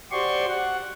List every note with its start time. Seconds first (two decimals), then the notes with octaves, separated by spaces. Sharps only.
0.12 F#4 G4 C5 D5 C6 C#6
0.49 F#5